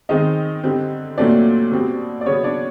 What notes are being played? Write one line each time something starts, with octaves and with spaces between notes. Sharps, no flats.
D#3 G#3 C4 D#4 D#5
D3 G3 C4
A#2 F#3 A3 C4 D4 D5
B2 G3 C4
D5
C#3 F#3 B3 C#4 C#5
D4 D5